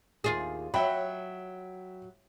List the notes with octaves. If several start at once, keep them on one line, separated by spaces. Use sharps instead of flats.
D#2 F4 G#4
F#3 E5 G5 B5